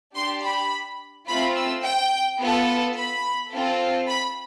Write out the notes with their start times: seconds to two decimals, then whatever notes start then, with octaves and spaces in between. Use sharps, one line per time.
0.16 D4 G4 C6
0.45 B5
1.29 A3 C4 F4 B5
1.56 E6
1.84 G5
2.41 B3 F4 A4
2.97 B5
3.54 C4 F4 A4
4.09 B5